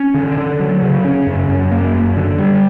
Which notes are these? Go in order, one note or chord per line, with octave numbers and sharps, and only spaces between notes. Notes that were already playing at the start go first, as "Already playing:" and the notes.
Already playing: C#4
D3
D3
F#3
C#3
C#4
F#2
F#2
A#3
F#2
D3
G3